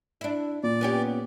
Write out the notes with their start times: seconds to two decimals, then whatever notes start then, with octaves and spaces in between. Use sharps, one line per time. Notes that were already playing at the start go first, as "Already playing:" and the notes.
0.21 D4 E4
0.63 A#2 D5
0.81 B3 C#4 G4